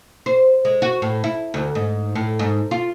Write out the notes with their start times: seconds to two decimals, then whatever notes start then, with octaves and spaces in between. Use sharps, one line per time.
0.26 C5
0.65 G#3
0.82 F#4
1.02 A2
1.24 E4
1.54 D2
1.75 G#2
2.15 A2
2.39 G#2
2.71 F4